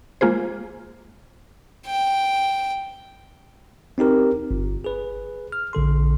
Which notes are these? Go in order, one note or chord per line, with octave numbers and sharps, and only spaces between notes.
G#3 A#3 F4 G#4 C5
G5
C4 D#4 G4 A#4
G1
G#4 B4
F6
A#1 D3 A4 C6